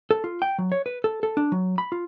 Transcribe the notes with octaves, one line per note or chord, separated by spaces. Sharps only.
A4
F4
G5
F#3
C#5
B4
A4
A4
D4
F#3
B5
F4